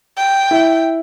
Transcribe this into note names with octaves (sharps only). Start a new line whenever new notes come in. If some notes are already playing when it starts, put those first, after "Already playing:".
G5
E4